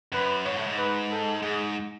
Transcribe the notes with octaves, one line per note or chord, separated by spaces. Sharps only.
F#2 B4
G#2 C#5
A2
G#2
B4
A4
G#2 G#4